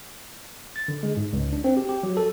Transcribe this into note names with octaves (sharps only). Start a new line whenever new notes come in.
A6
D3
G#3
G#2
C#2
D4
C4
G4
G4
F#3
A4